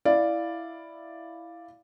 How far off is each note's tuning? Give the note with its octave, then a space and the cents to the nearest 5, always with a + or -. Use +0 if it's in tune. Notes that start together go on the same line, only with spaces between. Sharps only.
E4 +0 D5 +0 F5 +0